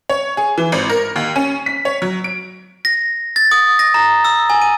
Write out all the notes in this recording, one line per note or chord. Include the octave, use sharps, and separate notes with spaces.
C#5
G#4
E3
G#1
A#4
D#2
C#4
B6
C#5
F#3
D7
A#6
A6
D#6
A#6
A#5
E6
G#5
D#7